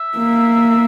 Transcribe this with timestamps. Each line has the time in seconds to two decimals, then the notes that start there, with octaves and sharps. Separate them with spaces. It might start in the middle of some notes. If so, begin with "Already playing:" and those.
Already playing: E5
0.16 A#3